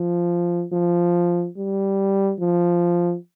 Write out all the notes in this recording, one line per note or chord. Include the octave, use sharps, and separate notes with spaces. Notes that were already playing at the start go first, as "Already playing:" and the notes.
Already playing: F3
F3
G3
F3